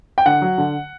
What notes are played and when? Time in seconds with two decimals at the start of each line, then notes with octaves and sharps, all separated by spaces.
0.18 G5
0.26 D3 F#5
0.42 F#3
0.58 D3